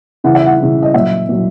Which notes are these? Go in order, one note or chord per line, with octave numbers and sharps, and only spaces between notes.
C#3 E3 F#5
E5
F#5
C#3 E3
D#5
A#2 F#3 E5
A#2 F#3